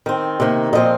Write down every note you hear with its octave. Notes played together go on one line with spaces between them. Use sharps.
D#3 C4
C3 D#3 A#3
A#2 F3 C4 D#5